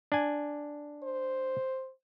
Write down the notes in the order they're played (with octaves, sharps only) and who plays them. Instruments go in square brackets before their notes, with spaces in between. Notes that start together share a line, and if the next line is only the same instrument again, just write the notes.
[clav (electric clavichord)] D4 G#5
[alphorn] C5